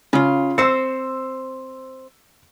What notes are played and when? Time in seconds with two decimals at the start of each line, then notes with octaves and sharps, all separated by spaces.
0.13 C#3 C#4 F4
0.58 C4 C5 E6 C#7